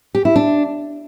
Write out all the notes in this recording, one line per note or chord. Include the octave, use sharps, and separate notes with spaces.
G4
E4
D4